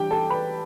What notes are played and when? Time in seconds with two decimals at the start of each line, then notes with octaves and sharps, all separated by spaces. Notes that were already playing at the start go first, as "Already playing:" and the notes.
Already playing: E3 G3 D4 G4 G5
0.11 A4 A5
0.30 B4 B5